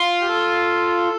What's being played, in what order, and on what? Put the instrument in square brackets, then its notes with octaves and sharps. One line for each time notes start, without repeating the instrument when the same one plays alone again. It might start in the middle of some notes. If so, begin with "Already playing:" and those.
Already playing: [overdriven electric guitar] F4
[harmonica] G4
A4